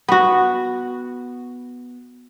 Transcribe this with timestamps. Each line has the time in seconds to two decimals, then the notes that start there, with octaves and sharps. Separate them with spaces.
0.08 B3 F#4